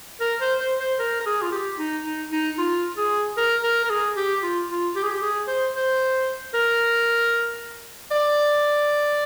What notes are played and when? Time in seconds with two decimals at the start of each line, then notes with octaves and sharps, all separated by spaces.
0.20 A#4
0.41 C5
0.60 C5
0.80 C5
0.99 A#4
1.20 A#4
1.26 G#4
1.42 F4
1.52 G4
1.78 D#4
2.05 D#4
2.32 D#4
2.59 F4
2.97 G#4
3.37 A#4
3.63 A#4
3.85 A#4
3.90 G#4
4.16 G4
4.43 F4
4.69 F4
4.96 G4
5.03 G#4
5.10 G4
5.22 G#4
5.48 C5
5.74 C5
6.54 A#4
8.11 D5